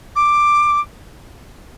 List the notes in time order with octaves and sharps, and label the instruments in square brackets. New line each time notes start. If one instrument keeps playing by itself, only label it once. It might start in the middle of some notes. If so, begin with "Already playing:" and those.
[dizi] D6